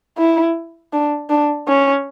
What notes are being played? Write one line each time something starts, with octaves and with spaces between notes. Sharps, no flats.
E4
D4
D4
C#4